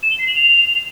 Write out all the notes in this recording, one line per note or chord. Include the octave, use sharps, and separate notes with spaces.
E7
G7
C7
F#7
F7